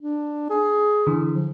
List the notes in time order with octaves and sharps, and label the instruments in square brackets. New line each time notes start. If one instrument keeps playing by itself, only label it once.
[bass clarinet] D4
G#4
[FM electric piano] D3 E3
[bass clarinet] F3